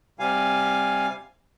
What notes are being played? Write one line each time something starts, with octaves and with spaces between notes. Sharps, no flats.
C3 G3 F5 G#5